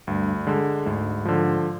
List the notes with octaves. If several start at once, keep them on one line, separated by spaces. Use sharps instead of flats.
D2 G2
D3 G#3
D2 G#2
D3 F3